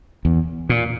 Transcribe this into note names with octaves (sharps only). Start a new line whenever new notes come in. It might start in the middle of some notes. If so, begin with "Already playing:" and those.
E2
A#2